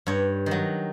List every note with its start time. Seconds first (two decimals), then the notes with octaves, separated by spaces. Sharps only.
0.07 G2 C#5
0.46 D#3 F#3